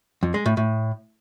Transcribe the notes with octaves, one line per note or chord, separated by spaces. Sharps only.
F2
G#3
A2
A2